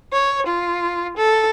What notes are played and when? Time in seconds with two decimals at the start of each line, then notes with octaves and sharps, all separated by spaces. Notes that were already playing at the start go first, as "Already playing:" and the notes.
0.13 C#5
0.46 F4
1.17 A4